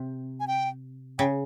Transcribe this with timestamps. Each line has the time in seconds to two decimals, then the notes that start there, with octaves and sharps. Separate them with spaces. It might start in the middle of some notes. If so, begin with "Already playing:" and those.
Already playing: C3
0.40 G#5
0.47 G5
1.18 C#3 G5